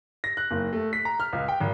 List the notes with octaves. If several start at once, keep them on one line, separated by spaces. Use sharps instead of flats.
A#6
F#6
F#1
A3
B6
A#5
F6
C#2
G5
G#1